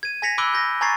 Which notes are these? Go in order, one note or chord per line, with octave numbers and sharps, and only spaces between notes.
G#6 D#7
G#5 G#6 A#6 B6 C#7 F7
B5 D6 E6 F#6 D7 G7
G6 A#6
G#5 A#5 C#6 G#6 A6 C7